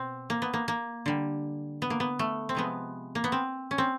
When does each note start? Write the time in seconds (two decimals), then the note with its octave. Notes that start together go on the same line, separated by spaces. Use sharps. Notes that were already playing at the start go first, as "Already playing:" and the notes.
Already playing: B2 C4
0.30 A#3
0.42 B3
0.53 A#3
0.68 A#3
1.06 D3 G3
1.82 B3
1.90 A#3
2.00 B3
2.19 A3
2.49 C4
2.55 C3 F3 G#3 B3
3.15 A#3
3.24 B3
3.32 C4
3.71 C#4
3.78 C4